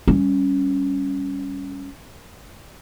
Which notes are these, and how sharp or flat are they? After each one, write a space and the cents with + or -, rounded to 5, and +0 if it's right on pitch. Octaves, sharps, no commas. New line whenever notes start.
G3 +0 C#4 +0